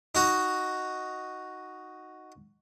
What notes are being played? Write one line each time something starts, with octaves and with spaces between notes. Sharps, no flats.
D#4 F#4